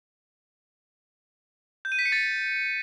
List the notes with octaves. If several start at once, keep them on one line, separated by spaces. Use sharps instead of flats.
G6
D#7
B6
C#7
A6